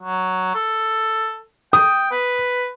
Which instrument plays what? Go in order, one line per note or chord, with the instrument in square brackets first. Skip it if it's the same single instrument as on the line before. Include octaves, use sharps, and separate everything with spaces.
[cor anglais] F#3
A4
[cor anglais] G5 [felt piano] D#6
[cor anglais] B4